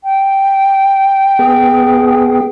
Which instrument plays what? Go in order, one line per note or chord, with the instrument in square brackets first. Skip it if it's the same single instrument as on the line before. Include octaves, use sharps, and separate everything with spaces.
[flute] G5
[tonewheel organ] B3 G#4